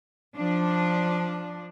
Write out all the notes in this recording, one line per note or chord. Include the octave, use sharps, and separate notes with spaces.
F3 D4